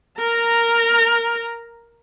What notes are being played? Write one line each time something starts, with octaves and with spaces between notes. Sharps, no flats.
A#4 A#5